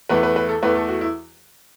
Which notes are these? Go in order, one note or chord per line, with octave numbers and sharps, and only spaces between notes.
E2 E3 A3 B4
B4
B4
A4
E2 E3 A3 B4
A4
F#4
E4